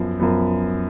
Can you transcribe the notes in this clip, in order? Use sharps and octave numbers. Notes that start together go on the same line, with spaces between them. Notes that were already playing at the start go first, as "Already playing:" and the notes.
Already playing: F#2 F3 B3
F#2 F3 B3